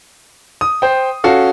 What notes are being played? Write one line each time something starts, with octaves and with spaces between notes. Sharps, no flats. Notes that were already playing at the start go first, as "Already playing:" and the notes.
D#6
C5 G5
C#4 F#4 A4 F5